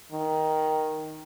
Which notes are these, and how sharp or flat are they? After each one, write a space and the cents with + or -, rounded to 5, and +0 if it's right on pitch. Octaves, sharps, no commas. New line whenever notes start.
D#3 +5